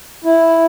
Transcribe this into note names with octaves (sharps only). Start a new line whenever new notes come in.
E4